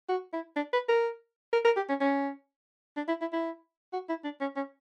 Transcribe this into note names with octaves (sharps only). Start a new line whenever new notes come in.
F#4
E4
D4
B4
A#4
A#4
A#4
G4
C#4
C#4
D4
E4
E4
E4
F#4
E4
D4
C#4
C#4